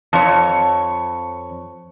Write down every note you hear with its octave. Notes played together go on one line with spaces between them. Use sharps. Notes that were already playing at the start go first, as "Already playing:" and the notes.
F2 C#5 A5